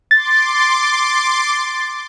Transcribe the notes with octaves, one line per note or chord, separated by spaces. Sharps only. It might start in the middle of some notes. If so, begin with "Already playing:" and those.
C6 D6 A6